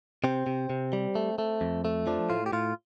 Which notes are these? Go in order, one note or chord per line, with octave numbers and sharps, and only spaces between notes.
C3 C4
C3
C3
G3
A3
A3
F2
A3
F3 D4
A2 F4
G4
A2 F4